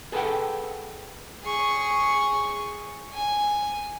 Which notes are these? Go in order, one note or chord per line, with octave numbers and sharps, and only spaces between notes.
G#4 A4 B4 D#5 F#5 G5
G#4 C#6
G#5